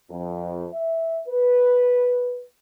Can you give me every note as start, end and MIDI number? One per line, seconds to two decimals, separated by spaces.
0.11 0.67 41
0.73 1.22 76
1.28 2.43 71